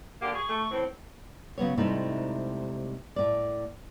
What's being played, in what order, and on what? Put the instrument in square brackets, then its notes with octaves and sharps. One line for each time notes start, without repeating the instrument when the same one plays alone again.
[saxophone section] D3 A#3 G4 [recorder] F#5
[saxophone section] G#4 [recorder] C#6
[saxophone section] A3
A2 E3 C4
[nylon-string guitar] C#3 F#3 B3 C#5
G#2 C3 G3 A3 D#4 E4
A2 D5